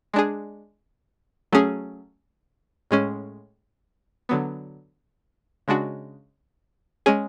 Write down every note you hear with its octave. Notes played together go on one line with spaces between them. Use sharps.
G#3 D4 G#4
F#3 A3 C#4 G#4
A2 G#3 C#4
D3 F#3 B3
C#3 G#3 D4 F#4
G#3 C#4 G#4